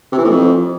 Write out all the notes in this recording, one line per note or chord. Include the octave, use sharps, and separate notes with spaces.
C3
E3
A2
F2